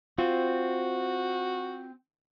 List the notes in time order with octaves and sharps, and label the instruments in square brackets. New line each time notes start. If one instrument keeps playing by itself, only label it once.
[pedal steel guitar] C4 [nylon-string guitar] F4 [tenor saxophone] F#4